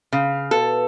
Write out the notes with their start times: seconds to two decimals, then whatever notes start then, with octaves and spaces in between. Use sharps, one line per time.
0.12 C#3 F5
0.51 B2 A4